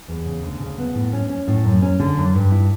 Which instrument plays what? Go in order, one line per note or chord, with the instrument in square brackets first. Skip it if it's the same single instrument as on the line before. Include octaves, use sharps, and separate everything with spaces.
[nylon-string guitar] E2
C#3
D2
C#3
B3
A2
C#4
C#4
A2
F#2
C#4
D3
F#2
G2
E4